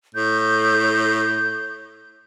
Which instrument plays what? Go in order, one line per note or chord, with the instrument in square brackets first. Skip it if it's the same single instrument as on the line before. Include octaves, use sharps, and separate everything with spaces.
[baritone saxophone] A2 [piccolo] G6